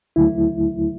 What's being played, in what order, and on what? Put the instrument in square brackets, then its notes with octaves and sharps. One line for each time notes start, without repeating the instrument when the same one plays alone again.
[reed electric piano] D2 D3 F#3 A3 E4